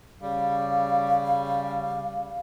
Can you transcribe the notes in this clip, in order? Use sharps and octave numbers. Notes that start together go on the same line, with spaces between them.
C#3 G3 F5